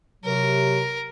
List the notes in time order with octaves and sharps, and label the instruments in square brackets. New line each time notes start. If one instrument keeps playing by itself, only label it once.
[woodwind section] C3 F#3 [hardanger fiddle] A#4